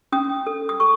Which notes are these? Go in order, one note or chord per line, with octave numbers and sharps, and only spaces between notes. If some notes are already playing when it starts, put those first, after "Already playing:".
C#4 D#6
A4
D#6
A4 C#6